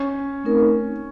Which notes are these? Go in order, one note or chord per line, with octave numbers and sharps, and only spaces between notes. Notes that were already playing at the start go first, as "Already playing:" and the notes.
Already playing: C#4
A3 C4 D#4 A#4